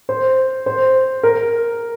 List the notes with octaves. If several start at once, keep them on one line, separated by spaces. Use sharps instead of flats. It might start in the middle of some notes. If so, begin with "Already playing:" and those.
C5
C5
A#4